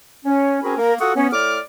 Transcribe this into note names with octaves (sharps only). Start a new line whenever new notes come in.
C#4
C4 C#4 F#4 G#4 A#4 B5
A#3 A#4
F4 F#4 A4 F#5 C#6 D#6
B3 C#4
A2 D5 D6 F6